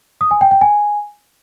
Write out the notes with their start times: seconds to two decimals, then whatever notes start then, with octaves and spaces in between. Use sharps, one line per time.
0.21 D#6
0.31 G#5
0.41 G5
0.51 G5
0.61 G#5